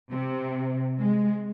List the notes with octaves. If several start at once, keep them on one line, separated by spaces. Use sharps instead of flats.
C3
G#3